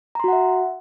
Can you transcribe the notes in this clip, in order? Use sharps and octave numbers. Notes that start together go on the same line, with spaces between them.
F#4 E5 F#5 A#5 C6